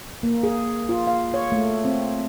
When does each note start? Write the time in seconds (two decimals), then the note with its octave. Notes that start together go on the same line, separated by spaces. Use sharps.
0.23 A#3
0.43 G#4
0.89 F4
1.07 F5
1.34 C#5
1.52 A3
1.85 C4